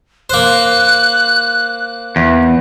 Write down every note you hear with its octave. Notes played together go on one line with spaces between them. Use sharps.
A#3 C5 F#6
E2